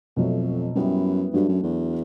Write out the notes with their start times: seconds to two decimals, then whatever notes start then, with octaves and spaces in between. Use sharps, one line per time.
0.16 F2 B2 F#3 A3
0.75 F#2 G3 B3 E4
1.33 G2 F#3 A3 D4 F#4
1.49 F#2
1.63 E2